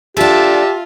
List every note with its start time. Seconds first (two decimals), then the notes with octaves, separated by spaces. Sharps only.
0.17 D4 F4 G4 A4 E5 A5